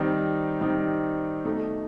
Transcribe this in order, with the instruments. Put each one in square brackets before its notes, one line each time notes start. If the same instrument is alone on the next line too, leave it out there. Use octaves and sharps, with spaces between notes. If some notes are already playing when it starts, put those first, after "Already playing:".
Already playing: [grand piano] D#3 G3 C4 D#4
D#3 G3 C4 D#4
B2 A3 D#4